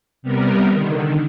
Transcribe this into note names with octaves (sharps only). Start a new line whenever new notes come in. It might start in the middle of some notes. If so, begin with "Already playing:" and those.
C3 G3 B3 A#4
D3 D#3